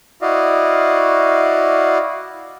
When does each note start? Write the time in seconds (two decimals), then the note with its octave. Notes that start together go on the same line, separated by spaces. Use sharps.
0.22 E4 F#4 D5 D#5 F5